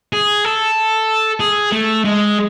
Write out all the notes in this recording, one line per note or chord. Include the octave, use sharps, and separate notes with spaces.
G#4
A4
G#4
A3
G#3